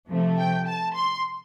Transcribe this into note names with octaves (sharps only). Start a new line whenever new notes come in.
C3 F3 A3
G5
A5
C6